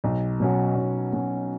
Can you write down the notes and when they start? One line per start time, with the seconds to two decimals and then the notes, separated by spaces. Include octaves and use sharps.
0.04 B1
0.40 B2 F#3 C#4 F#4
0.76 B1
1.13 B2 F#3 C#4 F#4